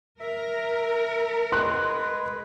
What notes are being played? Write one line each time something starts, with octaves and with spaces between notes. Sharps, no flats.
A#4 E5
G#3 B4 C6 F#6